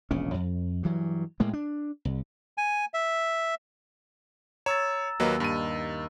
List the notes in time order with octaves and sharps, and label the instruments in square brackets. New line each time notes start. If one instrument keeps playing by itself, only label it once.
[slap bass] E1 A#1 C#3 C#4
F2
G2 E3 F#3
A2 G#3 A#3
D4
C2
[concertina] G#5
E5
[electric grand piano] C#5 [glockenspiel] A#5 E6 A6
[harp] D#2 [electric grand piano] F#3 A#3 B4
[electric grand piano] G2 D#7